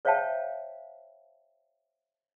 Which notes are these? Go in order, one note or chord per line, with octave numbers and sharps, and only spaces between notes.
C5 C#5 E5 F5 G5 A5